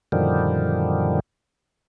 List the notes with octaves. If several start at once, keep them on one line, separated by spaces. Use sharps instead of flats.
F#2 A#2 D3 D#3 F3 G3